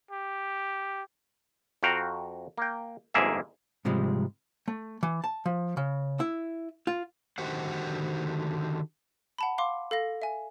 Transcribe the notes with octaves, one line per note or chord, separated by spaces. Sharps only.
G4
F2 F#4 F5 G5 A#5
A#3 G5
G1 F2 G#2 A#3 G#4 E5
G#2 C3 F3 G3 G#3
A3
E3
A5
F3
C#3
E4
F4
D3 D#3 F#4 G4 C5 F#5
F#5 A5 B5
F5 C6 D6
A4 F5 A#6
E5 G#5